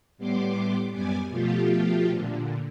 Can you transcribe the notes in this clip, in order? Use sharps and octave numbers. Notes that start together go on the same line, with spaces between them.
A2 G3 B3 C6 D6
F#2 G3 B3 G#5 D6
B2 F3 A3 F4 G4
A#2 D3